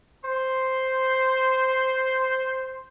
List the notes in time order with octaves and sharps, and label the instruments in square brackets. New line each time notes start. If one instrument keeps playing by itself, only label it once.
[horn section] C5 C6